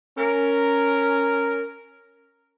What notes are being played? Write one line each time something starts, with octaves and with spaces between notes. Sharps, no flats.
C#4 A#4